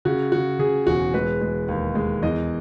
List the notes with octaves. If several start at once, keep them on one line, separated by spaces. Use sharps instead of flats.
C#3 F#4
C#3 F#4
C#3 G#4
E1 F#4
G#3 B4
G#3
D#2
G#3
E2 D#5